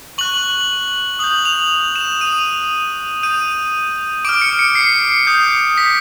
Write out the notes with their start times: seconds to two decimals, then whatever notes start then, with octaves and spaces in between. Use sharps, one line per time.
0.18 C#6 F#6 F#7
1.19 D#6 G6 F#7
1.45 F7
1.96 E7
2.21 D#6 F#6 D#7
3.23 D#6 G6 D#7
4.25 D6 F6 D7
4.42 C#7
4.59 C#7
4.75 C7
5.27 D#6 G6
5.78 B6